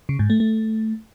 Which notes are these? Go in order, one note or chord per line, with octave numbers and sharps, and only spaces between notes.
C#3
G#2
A3
A3